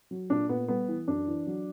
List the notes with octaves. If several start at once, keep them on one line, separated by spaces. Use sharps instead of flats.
F#3
A#2 D4
A#2 B3
G3 B3
E3
F#2 D4
E3
F#3